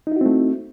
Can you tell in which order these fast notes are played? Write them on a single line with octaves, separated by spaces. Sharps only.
D#4 E4 F#4 C4 A3